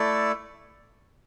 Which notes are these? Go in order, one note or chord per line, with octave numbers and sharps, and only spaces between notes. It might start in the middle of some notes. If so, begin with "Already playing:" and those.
Already playing: A3 E4 A4 D5